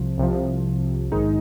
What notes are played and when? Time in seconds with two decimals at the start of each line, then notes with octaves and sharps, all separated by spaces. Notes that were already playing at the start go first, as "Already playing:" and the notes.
Already playing: C2 C3 F3
0.18 C2 C3 F3
1.11 A#1 G#2 D#3 G#3 D#4